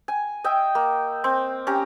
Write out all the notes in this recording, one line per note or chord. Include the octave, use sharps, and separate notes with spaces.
G#5
D#5 E5 G5
A#3
C4
C#4 G4 A#5